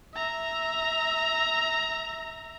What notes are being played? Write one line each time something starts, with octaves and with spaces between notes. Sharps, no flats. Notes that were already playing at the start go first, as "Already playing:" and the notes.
E5 A#5